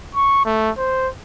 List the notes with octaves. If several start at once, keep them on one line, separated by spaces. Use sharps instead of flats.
C#6
A3
C5